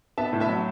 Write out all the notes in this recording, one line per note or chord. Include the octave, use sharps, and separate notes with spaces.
B3 E5 A5
A2
E5 A5
F#3